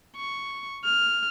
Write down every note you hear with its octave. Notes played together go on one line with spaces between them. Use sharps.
C#6
F6